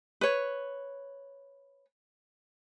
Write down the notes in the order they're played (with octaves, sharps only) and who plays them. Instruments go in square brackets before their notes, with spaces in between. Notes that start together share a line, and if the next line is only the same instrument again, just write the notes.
[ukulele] B4 C#5